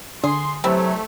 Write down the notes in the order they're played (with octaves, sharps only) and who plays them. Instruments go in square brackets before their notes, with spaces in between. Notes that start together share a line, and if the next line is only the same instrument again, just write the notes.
[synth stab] D3 [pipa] G#4 [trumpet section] C6
[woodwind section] C3 F#3 [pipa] E3 G3 C4 [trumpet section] A3